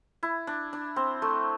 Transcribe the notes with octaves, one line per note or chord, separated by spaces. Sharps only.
E4
D4
D4
C4
A3